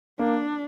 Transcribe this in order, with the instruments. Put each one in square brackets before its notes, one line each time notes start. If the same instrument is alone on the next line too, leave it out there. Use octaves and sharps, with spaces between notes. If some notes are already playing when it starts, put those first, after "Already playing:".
[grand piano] A#3 [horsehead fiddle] D4